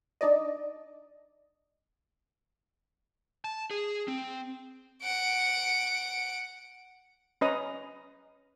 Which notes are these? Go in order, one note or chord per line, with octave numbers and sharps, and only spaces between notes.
D4 D#4 D5 D#5
A5
G#4
C4
F#5 D7
C#4 B4 D#5 A#5 D#6